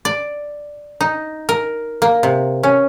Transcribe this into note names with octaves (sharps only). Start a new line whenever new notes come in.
D5
D#4
A#4
A#3
C3
C#4